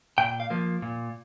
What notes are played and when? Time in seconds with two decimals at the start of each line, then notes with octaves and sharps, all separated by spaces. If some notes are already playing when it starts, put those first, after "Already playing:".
0.18 A#2 G5
0.40 F5
0.50 F3 A#3
0.82 A#2